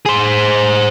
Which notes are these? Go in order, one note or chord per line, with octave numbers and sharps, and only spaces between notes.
G#4 C5